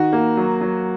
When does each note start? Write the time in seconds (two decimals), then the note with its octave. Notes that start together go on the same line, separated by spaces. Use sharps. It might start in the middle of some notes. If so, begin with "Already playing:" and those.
Already playing: D#3 F#4
0.13 A#3
0.37 F#3
0.61 F#3